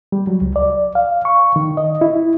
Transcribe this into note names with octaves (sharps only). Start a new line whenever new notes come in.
G3
F#3
C#2
D5
F5
C#6
D#3
D#5
E4